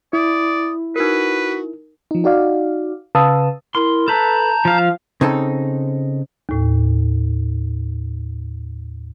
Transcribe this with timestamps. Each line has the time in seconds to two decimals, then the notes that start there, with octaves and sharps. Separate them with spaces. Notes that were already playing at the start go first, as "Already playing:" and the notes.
0.13 E4 D5 D#6
0.96 D#4 F#4 A#4 B4
2.11 F3 D#4
2.24 D#4 F#4 D5 F5
3.15 C#3 B4 F5 A5 D#6 E6
3.75 E4 A#4 C6
4.08 A4 B4 A5 A#5 G6
4.65 F3 F5
5.21 C#3 C4 D#4 A4
6.49 D#2 A2